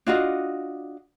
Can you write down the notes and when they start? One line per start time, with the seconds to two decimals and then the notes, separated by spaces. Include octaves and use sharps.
0.07 D4 F4 F#4 D#5